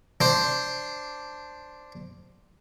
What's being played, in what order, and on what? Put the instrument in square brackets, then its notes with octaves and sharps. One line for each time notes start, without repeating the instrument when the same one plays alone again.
[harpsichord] D4 C5